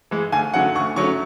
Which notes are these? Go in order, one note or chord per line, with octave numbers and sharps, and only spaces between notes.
E3 G#3
D2 G#5
D3 F#3 A3 C#4 F#5
D2 C#6
D3 F#3 A3 C#4 C#6